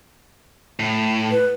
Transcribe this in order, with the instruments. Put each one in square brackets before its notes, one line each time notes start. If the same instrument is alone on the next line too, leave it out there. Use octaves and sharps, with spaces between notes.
[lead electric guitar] A2
[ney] B4